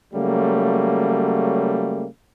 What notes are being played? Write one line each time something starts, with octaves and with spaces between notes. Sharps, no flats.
C#3 F#3 G3 A3 A#3